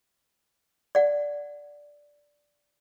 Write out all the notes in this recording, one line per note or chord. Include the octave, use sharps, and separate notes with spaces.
D5 F#5